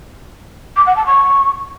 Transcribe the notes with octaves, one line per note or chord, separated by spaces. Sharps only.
D6
F#5
A5
C#6